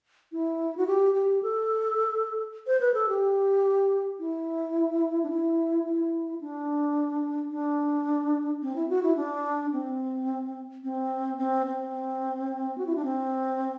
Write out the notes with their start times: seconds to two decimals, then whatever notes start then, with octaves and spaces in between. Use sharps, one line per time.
0.32 E4
0.77 F#4
0.87 G4
1.15 G4
1.43 A4
2.67 C5
2.81 B4
2.94 A4
3.09 G4
4.20 E4
5.23 D4
5.30 E4
5.85 E4
6.41 D4
7.52 D4
8.62 C4
8.76 E4
8.89 F#4
9.03 E4
9.17 D4
9.73 C4
10.84 C4
11.38 C4
11.67 C4
12.78 F#4
12.87 E4
12.96 D4
13.05 C4